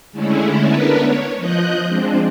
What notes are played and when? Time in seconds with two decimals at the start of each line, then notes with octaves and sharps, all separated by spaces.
0.12 D3 G#3 A3 C#4 E4
0.63 B3 D4 A#4 B4
0.98 C#5
1.37 F3 D#5 F#6 G6
1.88 F3 G#3 C4 D4